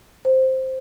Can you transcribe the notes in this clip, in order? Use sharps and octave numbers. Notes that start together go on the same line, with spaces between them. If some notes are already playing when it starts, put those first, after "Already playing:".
C5